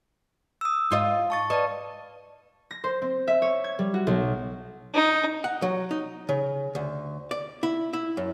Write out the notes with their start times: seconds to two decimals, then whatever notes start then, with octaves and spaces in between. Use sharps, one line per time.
0.61 D#6 E6
0.90 G#2 F4 D#5
1.30 A5 C#6 A6
1.50 B4 D5 D#5 A5
2.71 A#6
2.84 C5
3.02 C4
3.28 E5
3.42 C#5
3.64 G#6
3.79 G3
3.94 F#4
4.07 B1
4.94 D#4
5.44 F#5
5.62 F#3
5.91 D#4
6.29 C#3
6.75 D2
7.31 D5
7.63 E4
7.93 E4
8.17 F#2